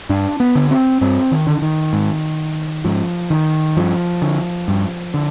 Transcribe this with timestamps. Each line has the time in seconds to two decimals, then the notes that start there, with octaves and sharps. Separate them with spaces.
0.09 G2 D4
0.40 B3
0.55 D3
0.71 C4
1.01 G2 C4
1.32 D#3
1.47 D3
1.62 D#3
1.93 G#2
2.84 G#2 F3
3.30 D#3
3.77 G2 F3
4.22 D3
4.68 G2
5.14 D3